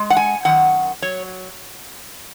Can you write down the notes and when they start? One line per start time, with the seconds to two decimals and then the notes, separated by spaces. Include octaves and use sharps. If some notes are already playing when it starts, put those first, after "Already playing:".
Already playing: G#3
0.10 F#5
0.17 G#5
0.45 F#2 D#3 F#5
1.02 F#3 C#5